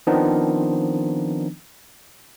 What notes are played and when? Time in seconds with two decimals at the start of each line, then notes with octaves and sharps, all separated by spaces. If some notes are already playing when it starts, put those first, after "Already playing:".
0.07 D#3 F3 B3 C4 D4 D#4